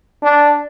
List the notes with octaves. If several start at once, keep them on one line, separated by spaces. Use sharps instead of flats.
D4